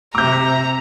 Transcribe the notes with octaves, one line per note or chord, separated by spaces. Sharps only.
C3 E5 A#5 D6 G6